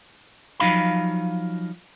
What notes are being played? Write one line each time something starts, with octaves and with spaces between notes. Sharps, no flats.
F3 F#3 D#4 F5 B5